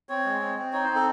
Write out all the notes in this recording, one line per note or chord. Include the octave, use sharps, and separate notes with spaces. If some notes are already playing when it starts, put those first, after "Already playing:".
C4 C#5
G#3
C4
C4
D#4 C#5
C4 C5
A4